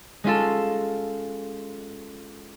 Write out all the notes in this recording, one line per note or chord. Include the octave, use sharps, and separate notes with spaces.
G#3 C#4 F4 A4